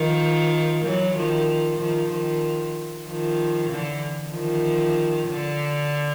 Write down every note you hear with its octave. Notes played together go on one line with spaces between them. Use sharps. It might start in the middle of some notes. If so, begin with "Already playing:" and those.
Already playing: D#3 F3
E3 F#3
D#3 F3
D#3 F3
D#3 F3
D#3 F3
D3 E3
D#3 F3
D3